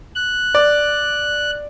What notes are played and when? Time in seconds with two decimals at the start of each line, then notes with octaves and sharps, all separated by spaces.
0.15 F#6
0.55 D5